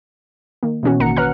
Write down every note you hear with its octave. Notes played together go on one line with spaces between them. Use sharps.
D#3 A#3
B2 E3 C#4 F#4
A1 D#3 A#3 F#5 A#5 C#7
B4 C#5 F#5 A#5 F6 F#6